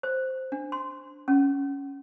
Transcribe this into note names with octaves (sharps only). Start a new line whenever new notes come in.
C5
D4
C6
C#4